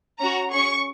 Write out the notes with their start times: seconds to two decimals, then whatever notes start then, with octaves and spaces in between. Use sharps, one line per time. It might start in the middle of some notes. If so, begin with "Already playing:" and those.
0.19 C#4 F#4 A#5
0.50 C#4 G#4 C#6